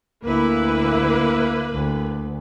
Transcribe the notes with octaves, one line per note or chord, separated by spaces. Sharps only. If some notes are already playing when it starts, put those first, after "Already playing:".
D2 A#3 E4 B4
D2